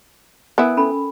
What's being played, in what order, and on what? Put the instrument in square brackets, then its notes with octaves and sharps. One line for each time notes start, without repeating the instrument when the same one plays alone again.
[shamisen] B3 E4 [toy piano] A#4 G#5
[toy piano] C#4 A4 B5